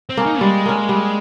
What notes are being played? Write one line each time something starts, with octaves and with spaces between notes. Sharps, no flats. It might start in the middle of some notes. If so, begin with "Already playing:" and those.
C4
A#3 C#4
D#4
G3 G#3
A#3 C#4
G3